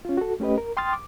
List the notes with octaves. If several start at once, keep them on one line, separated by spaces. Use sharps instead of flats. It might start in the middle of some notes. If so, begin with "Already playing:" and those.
C#4 F4
F#4 A4
A3 C#4 G4 B4 D#5
A#4
G5 C6 D#6 F6 A6
D6